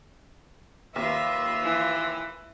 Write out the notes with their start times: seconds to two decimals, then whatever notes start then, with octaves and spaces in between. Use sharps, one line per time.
0.96 D#2 F4 B4 E5
1.63 E3